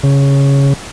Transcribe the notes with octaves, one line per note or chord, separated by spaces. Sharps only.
C#3